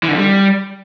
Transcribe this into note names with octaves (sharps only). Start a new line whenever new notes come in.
E3
D3
F2
G3